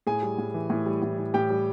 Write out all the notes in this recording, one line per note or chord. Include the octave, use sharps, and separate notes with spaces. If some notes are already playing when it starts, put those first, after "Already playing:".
A2 G#4 G#5
G3
A2
E3
A2
G3
A2
E3
A2 G4 G5
G3